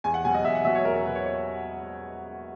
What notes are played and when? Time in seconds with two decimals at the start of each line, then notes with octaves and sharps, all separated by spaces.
0.04 E2 G#5
0.14 F#5
0.25 B2 F#3 G#5
0.34 D#5
0.44 E2 E5
0.55 F#5
0.65 B2 F#3 E5
0.75 C#5
0.85 E2 A#4
0.96 A#4
1.05 F#3 B4
1.09 B2
1.15 C#5
1.25 C#5